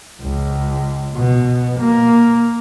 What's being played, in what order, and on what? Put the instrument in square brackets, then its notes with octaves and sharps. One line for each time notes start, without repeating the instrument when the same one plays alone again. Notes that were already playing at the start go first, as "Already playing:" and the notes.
[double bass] C#2
B2
A#3